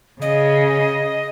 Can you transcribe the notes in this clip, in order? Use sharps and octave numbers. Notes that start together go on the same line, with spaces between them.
C#3 D#5